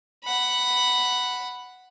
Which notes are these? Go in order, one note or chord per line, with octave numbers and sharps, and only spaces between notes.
F#5 B5